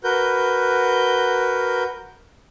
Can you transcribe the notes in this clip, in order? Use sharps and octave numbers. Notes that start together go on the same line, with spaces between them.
F#4 A#4 B4 G6